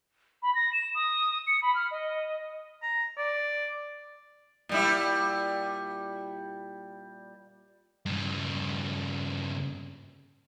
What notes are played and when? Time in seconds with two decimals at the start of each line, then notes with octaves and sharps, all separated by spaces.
0.43 B5
0.55 A#6
0.73 E7
0.95 D#6
1.47 C#7
1.62 B5
1.75 F6
1.91 D#5
2.83 A#5
3.18 D5
4.69 A#2 G3 E4
8.06 G2 C#3